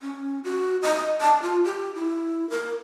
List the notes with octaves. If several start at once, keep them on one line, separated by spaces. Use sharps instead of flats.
C#4
F#4
D#5
A5
F4
G4
E4
A#4